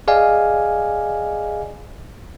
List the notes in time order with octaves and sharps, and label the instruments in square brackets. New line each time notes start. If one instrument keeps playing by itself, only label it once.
[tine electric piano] G#4 D5 D#5 F5 G#5